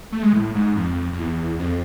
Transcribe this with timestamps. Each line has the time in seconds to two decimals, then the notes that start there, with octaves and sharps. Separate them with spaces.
0.12 A3
0.23 G#3
0.33 A2
0.55 G#2
0.76 F2
1.13 F2
1.18 E2
1.59 F2